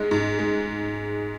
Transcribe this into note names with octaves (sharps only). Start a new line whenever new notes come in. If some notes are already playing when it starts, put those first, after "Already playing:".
Already playing: G#2 G#3
G#2
G#3